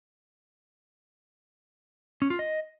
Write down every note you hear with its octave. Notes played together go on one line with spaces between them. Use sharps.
C#4
F4
D#5